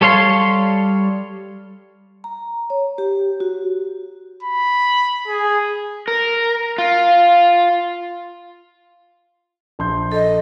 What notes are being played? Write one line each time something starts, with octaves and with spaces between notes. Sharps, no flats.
G3 A4 C#5 F5 C6
A#5
C#5
G4
F#4
B5
G#4
A#4
F4
A#1 C6 G6
A4 D#5